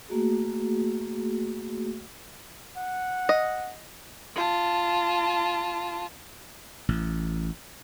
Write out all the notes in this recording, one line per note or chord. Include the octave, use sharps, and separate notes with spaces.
A3 A#3 F#4 G#4
F#5
D#5
F4 A5
A1